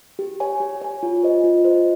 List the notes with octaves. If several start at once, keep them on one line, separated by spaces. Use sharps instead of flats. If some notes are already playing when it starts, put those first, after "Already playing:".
G4
C#5 G#5
G4
C#5 G#5
F4
C5 D#5
F4
C5 D#5